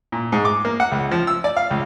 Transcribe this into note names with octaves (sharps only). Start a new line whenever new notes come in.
A#2
G#2
D6
A#3
F#5
C#2
F3
E6
D5
F5
C#2